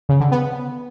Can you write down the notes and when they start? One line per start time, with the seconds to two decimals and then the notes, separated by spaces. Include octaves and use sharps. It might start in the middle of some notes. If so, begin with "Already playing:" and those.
0.09 C#3
0.20 D3
0.32 B3